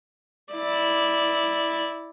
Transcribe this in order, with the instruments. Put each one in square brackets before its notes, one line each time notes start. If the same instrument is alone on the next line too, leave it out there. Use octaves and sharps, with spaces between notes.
[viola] E4 D5